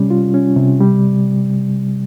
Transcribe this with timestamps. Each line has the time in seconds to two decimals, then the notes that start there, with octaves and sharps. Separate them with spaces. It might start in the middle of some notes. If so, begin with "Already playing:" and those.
Already playing: C3 G3 C#4
0.10 F4
0.34 C#4
0.56 C3
0.80 G3